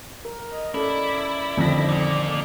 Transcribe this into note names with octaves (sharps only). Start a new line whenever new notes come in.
A#4
D#5
C#4 E4 A4 D5
F2 D3 D#3 C4 A#6
A#2 A#3